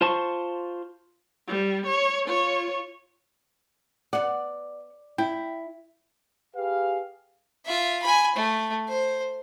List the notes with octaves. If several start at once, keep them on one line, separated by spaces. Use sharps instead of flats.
F4 C5 A5 C6 C#6
G3
C#5
F4 C#5
B3 D5 F#5
E4 G5
G4 G#4 B4 F5
F4 E5
G#5 B5
A3
C5